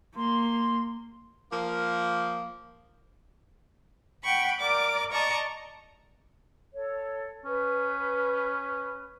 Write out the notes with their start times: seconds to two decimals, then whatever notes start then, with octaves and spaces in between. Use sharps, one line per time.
0.16 A#3 C6
1.51 F3 A#3
4.25 F#5 G5 B5 C#6
4.61 A#4 D5 D6
5.12 D5 D#5 A5 A#5 C#6
6.73 A4 C#5
7.45 C#4 B4